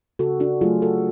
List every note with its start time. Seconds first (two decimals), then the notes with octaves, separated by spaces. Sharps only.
0.19 C#3 F#4 A4
0.40 D4 F#4
0.61 F#3 A3 F4 G#4
0.82 F#4 A4